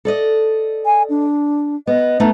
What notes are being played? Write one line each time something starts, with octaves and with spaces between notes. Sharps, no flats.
A4 D5 D#5
G#5
D4
B3 D#5
A3 B3 D#4